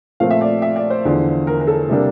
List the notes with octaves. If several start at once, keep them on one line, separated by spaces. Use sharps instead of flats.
A#2 F3 A3 C4 F5
E5
D5
E5
D5
C5
E2 D3 F3
A#4
A#4
A4
C3 G3 A#3 D4